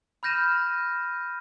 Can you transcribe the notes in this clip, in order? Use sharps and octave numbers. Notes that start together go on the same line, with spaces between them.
B5 F6 G6 A#6 D#7 E7